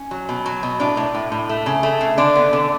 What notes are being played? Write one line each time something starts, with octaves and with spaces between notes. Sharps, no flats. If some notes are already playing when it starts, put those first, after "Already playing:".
Already playing: C#4
F#3
B2
F#3
B2
A2 D4
A2
A2
A2
A3
C#3
A3
C#3
D3 D4
B3
D3